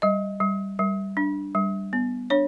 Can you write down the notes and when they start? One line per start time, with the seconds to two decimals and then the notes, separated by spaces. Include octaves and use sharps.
0.02 G3 D#5
0.40 G3
0.79 G3
1.17 D4
1.55 G3
1.93 B3
2.30 D4 C#5